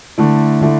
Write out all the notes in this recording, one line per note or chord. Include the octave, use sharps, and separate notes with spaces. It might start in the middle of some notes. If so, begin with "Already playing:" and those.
D3 A3 E4
D3 A3 E4